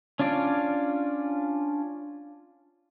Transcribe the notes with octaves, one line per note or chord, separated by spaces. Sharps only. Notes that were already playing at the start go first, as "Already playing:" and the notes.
C#4 D4 F4 D5